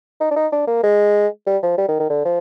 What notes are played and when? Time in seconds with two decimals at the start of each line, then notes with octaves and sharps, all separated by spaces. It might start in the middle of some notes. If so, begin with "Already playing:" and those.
0.20 D#4
0.31 D4
0.36 D#4
0.52 D4
0.67 A#3
0.83 G#3
1.47 G3
1.63 F3
1.78 G3
1.88 D#3
2.00 D#3
2.10 D3
2.25 F3